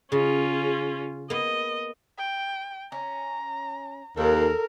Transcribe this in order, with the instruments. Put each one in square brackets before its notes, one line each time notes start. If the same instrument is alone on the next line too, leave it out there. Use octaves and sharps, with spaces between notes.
[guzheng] C#3 [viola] C#4 F4
[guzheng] A#3 B3 [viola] D#5
[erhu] G5
[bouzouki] C#4 [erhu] A#5
[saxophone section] D#2 [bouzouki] A4 [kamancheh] A#4